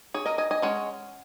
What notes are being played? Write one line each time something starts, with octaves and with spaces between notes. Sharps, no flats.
G#4 C#5
A#4 D#5
D#5 G#5
D#5 G#5
G#3 C#4 C#5 F#5